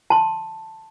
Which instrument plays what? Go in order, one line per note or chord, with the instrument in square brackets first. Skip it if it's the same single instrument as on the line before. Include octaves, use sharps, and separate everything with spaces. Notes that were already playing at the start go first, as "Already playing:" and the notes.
[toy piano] A5 C6